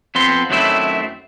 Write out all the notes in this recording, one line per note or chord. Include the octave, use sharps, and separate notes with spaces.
F2 B3 C4 C6
F#2 D#3 F#3 A3 C4 E4